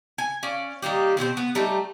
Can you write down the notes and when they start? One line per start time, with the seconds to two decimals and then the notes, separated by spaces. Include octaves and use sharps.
0.18 G#5
0.43 C#4 D5 F5
0.82 D#3 G3 A#3 G4
1.17 B2 C4 G4 C5
1.37 B3
1.55 G3 A3 D#4